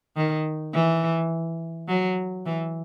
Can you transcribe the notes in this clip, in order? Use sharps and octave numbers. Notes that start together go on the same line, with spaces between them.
D#3
E3
F#3
E3